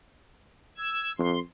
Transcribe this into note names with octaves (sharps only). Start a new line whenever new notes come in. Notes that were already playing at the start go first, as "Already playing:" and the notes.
E6 G#6
F2 C6